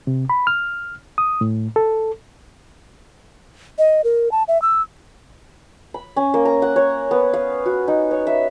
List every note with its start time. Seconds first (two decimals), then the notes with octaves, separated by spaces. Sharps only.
0.07 C3
0.30 B5
0.47 F6
1.18 D#6
1.41 A2
1.76 A4
3.79 D#5
4.04 A#4
4.31 A5
4.48 E5
4.62 E6
5.94 B5
6.16 C#4
6.34 A#3
6.45 A#5
6.62 F#5
6.76 C#5
7.11 B3
7.34 F5
7.66 F#4
7.88 D#4
8.11 C#5
8.27 E5